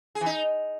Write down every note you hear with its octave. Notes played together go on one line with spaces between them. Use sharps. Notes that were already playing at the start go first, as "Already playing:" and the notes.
G#4
E3
D#4